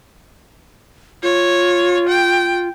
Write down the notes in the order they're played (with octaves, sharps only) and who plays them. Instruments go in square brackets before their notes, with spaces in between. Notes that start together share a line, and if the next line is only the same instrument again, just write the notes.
[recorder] F4 [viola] C#5
[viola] G5